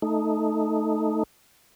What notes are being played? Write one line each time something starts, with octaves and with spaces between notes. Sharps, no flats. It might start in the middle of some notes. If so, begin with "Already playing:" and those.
A3 D#4